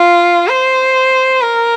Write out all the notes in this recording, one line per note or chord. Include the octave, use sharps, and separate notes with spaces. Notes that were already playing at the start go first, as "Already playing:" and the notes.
Already playing: F4
C5
A#4